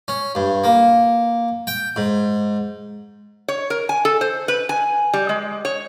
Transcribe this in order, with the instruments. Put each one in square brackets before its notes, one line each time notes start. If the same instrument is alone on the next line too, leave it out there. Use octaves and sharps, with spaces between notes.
[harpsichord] C#4
G2
A#3
G5
G#2
[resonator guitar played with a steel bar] C#5
A#4
G#5
A4
C5
B4
G#5
G3
G#3
C#5